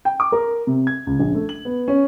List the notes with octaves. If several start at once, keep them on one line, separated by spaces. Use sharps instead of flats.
G5
D6
A#4
C3
G#6
C#2
A#1
A3
F#7
B3
C#4